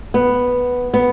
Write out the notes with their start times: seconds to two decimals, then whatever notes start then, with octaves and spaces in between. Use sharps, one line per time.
0.14 B3
0.94 B3